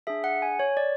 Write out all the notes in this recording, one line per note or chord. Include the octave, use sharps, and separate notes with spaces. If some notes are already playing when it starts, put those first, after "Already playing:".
D4 G#4 E5
F#5
G#5
C#5
D5